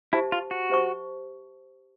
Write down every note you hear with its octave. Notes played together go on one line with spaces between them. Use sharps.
E4 G4 C5 E5 A5 C#6
F4
F#4
G4 C5 E5 A5 C#6